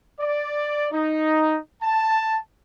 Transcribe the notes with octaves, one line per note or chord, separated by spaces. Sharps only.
D5
D#4
A5